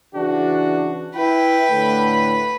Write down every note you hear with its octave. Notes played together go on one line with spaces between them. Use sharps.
C#3 E3 D4 F#4
E4 B4 G5
A2 D3